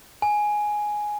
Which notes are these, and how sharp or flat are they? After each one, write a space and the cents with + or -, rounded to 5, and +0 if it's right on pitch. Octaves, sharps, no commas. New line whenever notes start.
G#5 +5